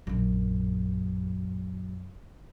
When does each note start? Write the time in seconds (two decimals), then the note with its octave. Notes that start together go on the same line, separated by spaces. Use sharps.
0.07 A#1 F#2